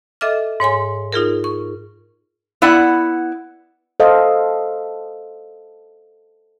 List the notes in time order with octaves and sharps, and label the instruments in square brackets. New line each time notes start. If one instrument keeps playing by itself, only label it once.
[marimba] A4 D#5 E5 D6 F6
G#2 C#5 G#5 C6
D#4 F4 G#4 A#4
C#6
[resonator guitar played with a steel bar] B3 E4 D5 F#5
[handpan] A4 C5 D#5 F5